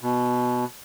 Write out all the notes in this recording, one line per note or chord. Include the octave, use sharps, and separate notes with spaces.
B2